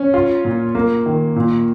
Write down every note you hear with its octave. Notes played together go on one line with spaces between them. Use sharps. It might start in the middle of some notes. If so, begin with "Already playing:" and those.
Already playing: C#4
F4
A#2
A#3
D#3
A#2